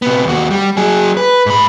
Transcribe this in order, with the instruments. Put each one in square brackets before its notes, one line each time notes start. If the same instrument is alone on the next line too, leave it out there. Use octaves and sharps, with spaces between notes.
[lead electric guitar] C3 B3
D#2 F#4
G3
F#3 G#4
B4
G#2 B5